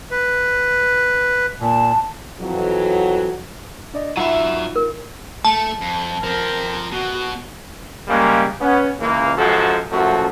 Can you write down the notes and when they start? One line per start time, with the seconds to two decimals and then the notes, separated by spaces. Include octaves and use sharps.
0.11 B4
1.61 A#2 A5
2.41 F2 E3 F#3
3.94 D4 D5 D#5
4.17 F#3 D#4 F4 E5 F#5 B5
4.76 A#4
5.45 A3 A5
5.81 F2
6.23 F3 C4 A#4
6.92 B2 F#4
8.08 C#3 G3 G#3 A#3
8.61 B3 C#4
8.99 C#2 E3 A#3
9.37 F#2 F3 G#3 F#4 A4 C5
9.91 A1 F#2 F3 A3 F#4